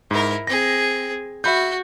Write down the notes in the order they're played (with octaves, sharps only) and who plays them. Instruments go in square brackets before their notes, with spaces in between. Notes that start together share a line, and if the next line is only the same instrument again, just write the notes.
[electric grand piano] G#2 [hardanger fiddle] E4 A#4
[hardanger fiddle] C4 G#4 [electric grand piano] A#6
[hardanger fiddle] F#4 [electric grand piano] E5 B5 G6